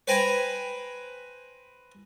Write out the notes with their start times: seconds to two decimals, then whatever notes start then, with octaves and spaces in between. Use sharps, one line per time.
0.08 B4 C5 G5 G#5 A#5 B5